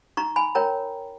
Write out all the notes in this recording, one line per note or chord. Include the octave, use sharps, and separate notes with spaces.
D#4 A#5 C#6
G#5 B5
A#4 C#5 G5 A#5